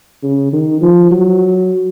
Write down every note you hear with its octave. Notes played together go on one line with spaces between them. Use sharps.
C#3
D#3
F3
F#3